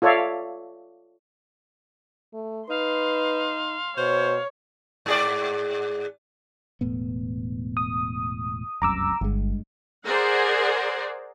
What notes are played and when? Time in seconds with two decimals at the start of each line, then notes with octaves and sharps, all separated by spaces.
0.02 F4 A4 C#5 D5 E5 F5
2.33 A3
2.69 D#4 B4 F5 C6
3.98 B2 C5 C#5
5.06 G#2 G#4 D5
6.81 E1 A2 B3
7.77 D#6
8.82 F1 C2 F#2 A#5 D6 E6
9.21 G1 G2 G#3
10.04 G#4 A#4 C5 D5 F#5